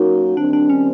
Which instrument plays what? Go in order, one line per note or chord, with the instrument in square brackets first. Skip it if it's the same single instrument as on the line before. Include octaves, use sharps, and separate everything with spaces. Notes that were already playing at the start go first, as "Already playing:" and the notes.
Already playing: [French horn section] F#3 A#3 C#4 F#4 A#4 [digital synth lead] D#4
[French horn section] D#3 G3 C4 [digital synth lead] D4
[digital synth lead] D4
C#4